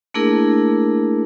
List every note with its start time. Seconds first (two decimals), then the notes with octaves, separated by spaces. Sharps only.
0.14 A3 A#3 D4 E4 G#4 A#4